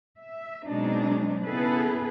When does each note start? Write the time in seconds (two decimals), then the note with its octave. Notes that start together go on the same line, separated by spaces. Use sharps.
0.19 E5
0.68 B2 F#3 G#3 C4 D4 D#4
1.45 C#3 B3 E4 G#4 A4 B4